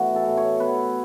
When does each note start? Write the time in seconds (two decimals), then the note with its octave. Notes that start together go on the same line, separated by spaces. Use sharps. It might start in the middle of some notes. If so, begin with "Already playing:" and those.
Already playing: A2 E3 B3 F#4
0.16 A4
0.27 A2
0.37 C#5
0.60 B3 B4